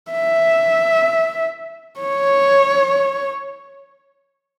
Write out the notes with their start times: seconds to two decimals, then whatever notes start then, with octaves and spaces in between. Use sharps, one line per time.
0.12 E5
2.00 C#5